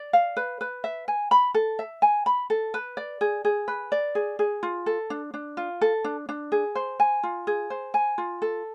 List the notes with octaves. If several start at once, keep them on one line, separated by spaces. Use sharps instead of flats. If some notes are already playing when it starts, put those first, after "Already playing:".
Already playing: D5
F5
B4
B4
E5
G#5
B5
A4
E5
G#5
B5
A4
B4
D5
G#4
G#4
B4
D5
G#4
G#4
F4
A4
D4
D4
F4
A4
D4
D4
G#4
C5
G#5
F4
G#4
C5
G#5
F4
A4